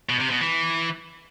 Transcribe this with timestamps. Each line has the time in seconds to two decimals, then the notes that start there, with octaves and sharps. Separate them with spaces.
0.09 B2
0.20 C3
0.30 B2
0.41 E3